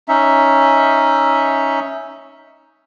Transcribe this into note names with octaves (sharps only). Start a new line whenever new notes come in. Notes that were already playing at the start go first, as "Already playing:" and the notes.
C#4 D#4 E5